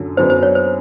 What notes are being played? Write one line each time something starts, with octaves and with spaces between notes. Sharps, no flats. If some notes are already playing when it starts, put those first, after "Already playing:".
Already playing: F#2 D3 F#3
F#2 D3 F#3 B3 C5
C5
C#5
C5